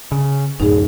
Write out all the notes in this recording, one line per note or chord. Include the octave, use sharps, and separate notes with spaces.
C#3
D1 F#2 A2 D#4 G#4